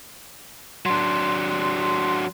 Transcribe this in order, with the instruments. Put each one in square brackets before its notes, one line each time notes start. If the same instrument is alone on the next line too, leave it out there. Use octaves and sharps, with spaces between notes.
[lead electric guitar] F#3 D4 [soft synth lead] C6